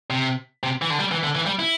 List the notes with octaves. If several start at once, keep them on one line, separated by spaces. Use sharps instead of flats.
C3
C3
E3
D3
G3
E3
D3
E3
G3
E4